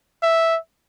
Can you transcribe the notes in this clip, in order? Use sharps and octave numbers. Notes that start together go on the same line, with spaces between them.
E5